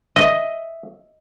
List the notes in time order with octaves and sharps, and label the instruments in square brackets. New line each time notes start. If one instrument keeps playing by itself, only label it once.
[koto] D#5 [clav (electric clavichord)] E5